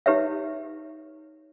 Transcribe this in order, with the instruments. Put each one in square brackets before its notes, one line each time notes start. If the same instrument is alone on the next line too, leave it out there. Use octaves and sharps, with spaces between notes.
[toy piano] D#4 G4 B4 C#5 E5